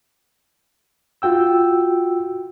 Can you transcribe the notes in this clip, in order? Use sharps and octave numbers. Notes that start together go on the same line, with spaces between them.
F4 F#4 G5 E6